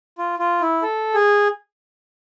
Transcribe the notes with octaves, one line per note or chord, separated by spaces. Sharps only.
F4
F4
E4
A4
G#4